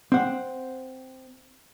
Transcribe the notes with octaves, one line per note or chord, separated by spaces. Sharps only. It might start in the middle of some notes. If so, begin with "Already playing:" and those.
C4 F#5